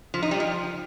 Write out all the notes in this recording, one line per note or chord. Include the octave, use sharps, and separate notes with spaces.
F3
D#4
G3
F3